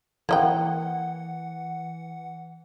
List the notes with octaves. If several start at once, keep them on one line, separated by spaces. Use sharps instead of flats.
E3 A#3 D#5 F#5 G5